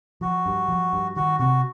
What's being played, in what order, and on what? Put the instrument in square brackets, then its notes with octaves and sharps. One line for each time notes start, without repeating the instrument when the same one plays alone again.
[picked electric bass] F3 [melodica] F#4
[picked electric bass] G2
F3
G2
[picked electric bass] D#3 [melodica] F#4
[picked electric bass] C3 [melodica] F#4